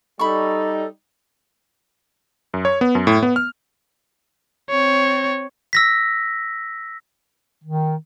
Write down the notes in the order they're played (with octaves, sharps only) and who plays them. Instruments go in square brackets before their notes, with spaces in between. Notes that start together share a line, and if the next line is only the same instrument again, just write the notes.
[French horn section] G3 D#4 [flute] A4 [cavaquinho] B5 C#6
[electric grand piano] F#2
C#5
B3
F#2
A2
B3
F6
[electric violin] C4 C#5
[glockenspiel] E6 A#6 B6
[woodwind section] D#3